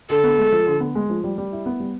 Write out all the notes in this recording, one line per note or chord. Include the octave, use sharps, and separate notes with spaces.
D3 A4
B3
G#3
F3
D3
B3
G#3
F3
G3
G3
E4
B3
G3